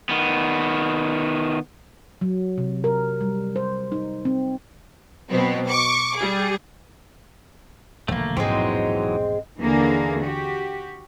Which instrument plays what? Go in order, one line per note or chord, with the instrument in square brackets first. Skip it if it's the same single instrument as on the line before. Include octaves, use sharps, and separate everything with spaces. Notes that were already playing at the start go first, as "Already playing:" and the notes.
[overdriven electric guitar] D#3 B3
[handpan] F#3
C3
A#4
G3
C5
D#4
C4
[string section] B2 F#3 B3 C4
C#6 D6
G3 G#4
[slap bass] E1 A#1 [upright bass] D3 [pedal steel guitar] A3 A#3
[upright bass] G#2 [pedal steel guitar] E3 F#3 D#4 [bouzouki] G#3 C4
[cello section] D#2 D3 E3 A#3 G#4
F#4 G4